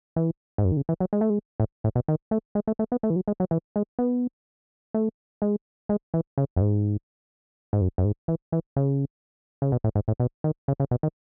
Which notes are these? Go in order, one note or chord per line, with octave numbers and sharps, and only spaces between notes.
E3
G#2
F#2
D#3
C#3
E3
F#3
G#3
A3
G#3
A2
A2
B2
D#3
A3
G#3
A3
A3
B3
A3
E3
F#3
G#3
F#3
E3
G#3
B3
A3
G#3
G#3
E3
C#3
F#2
G#2
G#2
F#2
F#2
G#2
E3
E3
C#3
C#3
B2
A2
G#2
A2
B2
D#3
C#3
C#3
B2
D#3